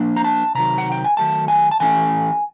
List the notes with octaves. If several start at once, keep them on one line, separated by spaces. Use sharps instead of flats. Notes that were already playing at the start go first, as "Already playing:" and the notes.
Already playing: F3 A#3 D4
A#5
A5
C3 D#3 F#3 A#5
F#5
G5
G#5
D#3 F#3 A3 A5
G#5
A5
E3 A3 C#4 E4 G#5